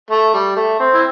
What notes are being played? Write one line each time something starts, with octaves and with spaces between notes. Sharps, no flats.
A3
G3
A3
C4
E4